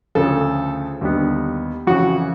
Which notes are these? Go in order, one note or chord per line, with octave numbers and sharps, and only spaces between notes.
D2 C#3 F3 A4
D#2 D3 G3 B3
F2 C#3 E3 F#4